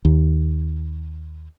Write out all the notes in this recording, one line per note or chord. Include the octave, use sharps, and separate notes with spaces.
D#2